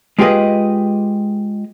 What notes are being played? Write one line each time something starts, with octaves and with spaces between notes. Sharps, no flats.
G#3 F4 G4 G#4 B4 D#5